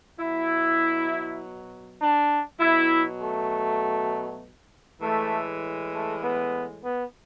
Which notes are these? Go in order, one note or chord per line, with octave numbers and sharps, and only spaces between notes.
B2 F#3 E4
D4
B2 F#3 E4
A3
A2 E3 G#3 A3
A3
B3
B3